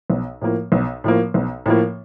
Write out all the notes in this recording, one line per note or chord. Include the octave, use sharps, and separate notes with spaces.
B1
A2 F3 A#3
B1
A2 F3 A#3
B1
A2 F3 A#3